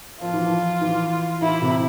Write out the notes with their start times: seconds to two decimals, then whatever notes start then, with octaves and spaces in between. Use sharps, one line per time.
0.20 F3 F4
0.33 E3
0.45 F3
0.81 E3
1.42 E3 E4
1.61 C3